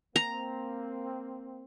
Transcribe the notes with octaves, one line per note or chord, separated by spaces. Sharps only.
A#3 C4 A#5